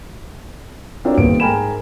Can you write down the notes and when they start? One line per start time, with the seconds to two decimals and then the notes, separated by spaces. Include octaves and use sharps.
1.05 C4 D4 F4 F#4 A#4 C#5
1.18 D#1 D#2 B3 C4 B4 D7
1.40 G#2 A#4 G5 G#5 B5 E7